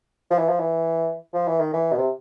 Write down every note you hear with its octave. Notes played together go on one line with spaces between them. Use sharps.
F3
E3
F3
E3
F3
E3
D#3
E3
B2
C3